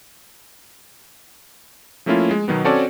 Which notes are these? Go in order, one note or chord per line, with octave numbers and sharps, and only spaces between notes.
F3 A3 A#3 C#4 E4 F4
G#3
B2 D#3 F#3 B3
C4 C#4 F#4 A4 C#5 D5